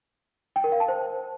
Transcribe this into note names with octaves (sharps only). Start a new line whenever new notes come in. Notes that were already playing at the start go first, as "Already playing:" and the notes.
G5
A#4
F5
A5
C5